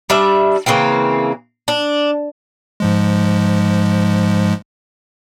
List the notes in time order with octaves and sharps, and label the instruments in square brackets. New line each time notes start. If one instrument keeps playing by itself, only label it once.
[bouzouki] G3 D4 E5
C#3 E3 A#3 C4
D4
[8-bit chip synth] G#2 F3 G#3